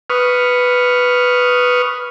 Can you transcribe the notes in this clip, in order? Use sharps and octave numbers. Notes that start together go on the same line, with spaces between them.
B4 C#6 D#6 F6